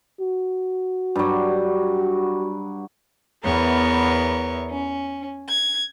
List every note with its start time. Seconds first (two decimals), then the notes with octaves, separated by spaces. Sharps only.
0.20 F#4
1.16 G2 F#3
3.44 E2 B3 A#4 C#5
4.70 C#4
5.48 G#6